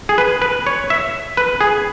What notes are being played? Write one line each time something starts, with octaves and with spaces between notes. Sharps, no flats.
G#4
B4
B4
C#5
E5
B4
G#4